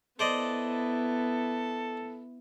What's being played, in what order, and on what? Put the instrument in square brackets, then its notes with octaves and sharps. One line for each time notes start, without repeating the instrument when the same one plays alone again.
[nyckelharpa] B3 E4 [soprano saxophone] A4 [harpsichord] C5 D5 D#5